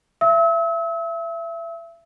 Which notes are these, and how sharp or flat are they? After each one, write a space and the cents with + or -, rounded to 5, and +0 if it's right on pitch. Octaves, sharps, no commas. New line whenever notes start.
E5 +25 E6 -40